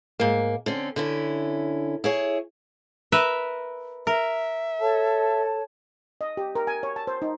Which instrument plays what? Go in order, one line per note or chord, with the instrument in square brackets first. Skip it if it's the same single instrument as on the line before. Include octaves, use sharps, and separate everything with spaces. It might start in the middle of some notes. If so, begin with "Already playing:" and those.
[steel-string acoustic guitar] G#2 A#3
D3 C4 C#4
D3 C#4 E4
E4 G#4 C#5
[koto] A#4 B4 E5
[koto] A#4 [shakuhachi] E5
[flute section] A4 C#5 A5
[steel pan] D#5
G4
A#4
G#5
C#5
A5
C5
D#4